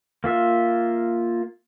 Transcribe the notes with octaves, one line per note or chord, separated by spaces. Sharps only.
A#3 F4 E5